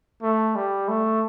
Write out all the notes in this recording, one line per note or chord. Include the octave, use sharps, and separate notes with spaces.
A3
G3
A3